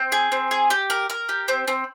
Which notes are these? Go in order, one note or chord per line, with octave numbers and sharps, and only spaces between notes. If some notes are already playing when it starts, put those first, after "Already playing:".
Already playing: C4
G#4
C4
G#4
G4
A#4
A#4
G4
C4
C4